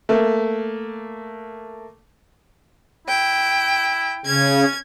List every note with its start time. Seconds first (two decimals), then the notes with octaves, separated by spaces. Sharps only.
0.09 A3 A#3
3.08 E4 G5
4.26 C#3 C#4 G#6